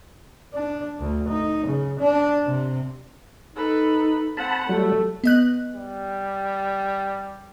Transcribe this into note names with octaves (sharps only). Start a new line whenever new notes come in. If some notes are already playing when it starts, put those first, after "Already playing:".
D4
D2
D#4
C#3
D4
C3
D#4 A4 B4
C4 F#5 A5 B5
F#3 G3 A3 A4
B3 D#5 F#6
G3